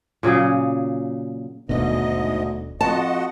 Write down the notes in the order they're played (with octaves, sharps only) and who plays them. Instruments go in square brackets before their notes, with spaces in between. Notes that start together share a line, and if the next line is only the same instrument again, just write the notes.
[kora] A#2 C#3 F#3 G#4
[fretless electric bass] D#1 G#1 B2 [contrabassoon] D2 [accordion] G#2 D#5
[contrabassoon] F2 [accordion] F#4 D#5 F#5 [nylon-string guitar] A5